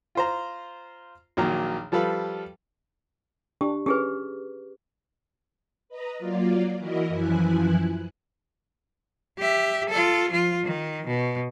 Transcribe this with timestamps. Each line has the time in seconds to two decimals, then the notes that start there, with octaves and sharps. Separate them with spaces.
0.15 F4 C5 A#5
1.37 A#1 D#3 F#3 A#3 A#5
1.92 F3 G3 A4 B4 F5
3.61 D4 G4
3.86 C#4 G4 G#4 B4
5.89 B4 D#5 A#5
6.19 F#3 A#3 F4 D5
6.77 E3 E4 F#4 A#4 D#5
7.08 F#2 E3 F3 E4 G#5 F#6
9.39 G4 E5
9.89 F4 A4
10.30 F3 F4
10.64 D#3
11.07 B2